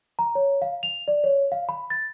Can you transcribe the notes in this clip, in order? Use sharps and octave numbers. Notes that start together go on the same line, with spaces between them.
A#5
C#5
F5
F7
D5
C#5
F5
B5
A6